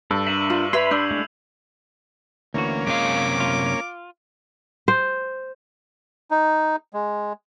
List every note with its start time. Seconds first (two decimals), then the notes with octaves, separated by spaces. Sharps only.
0.11 G2 A4 E6
0.27 D4 A#4 E5 D#7 E7 F#7
0.50 F4 E6
0.73 B4 E5 B5 C6 G#6 C7 F7
0.91 D4 E6 G6
1.11 G#3 A3 E4
2.54 D2 E3 A#3 C#4 F#4
2.87 F#2 C3 G#3 F4 F5 D6
3.40 F4
4.88 C5
6.31 D#4
6.93 G#3